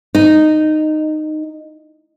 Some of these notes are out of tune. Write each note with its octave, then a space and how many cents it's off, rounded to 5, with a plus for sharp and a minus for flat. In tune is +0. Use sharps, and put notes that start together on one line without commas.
D#4 -10